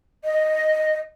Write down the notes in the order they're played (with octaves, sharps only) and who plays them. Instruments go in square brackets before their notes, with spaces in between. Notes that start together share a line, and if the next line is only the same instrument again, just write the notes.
[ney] D#5